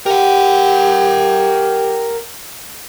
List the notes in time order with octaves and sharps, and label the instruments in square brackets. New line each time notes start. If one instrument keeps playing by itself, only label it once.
[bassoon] G4 [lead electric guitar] A#4 F#5